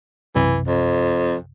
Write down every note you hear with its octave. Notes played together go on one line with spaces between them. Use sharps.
B1 F#2 C3 E3
F2